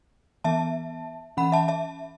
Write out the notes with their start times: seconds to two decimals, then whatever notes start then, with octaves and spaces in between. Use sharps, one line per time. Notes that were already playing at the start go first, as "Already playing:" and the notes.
0.44 E3 B3 E5 A5
1.37 E3 C#4 F#5 B5
1.52 E5 A5
1.68 E5 A5